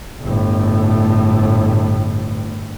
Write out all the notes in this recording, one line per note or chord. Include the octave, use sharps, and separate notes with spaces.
G1 A2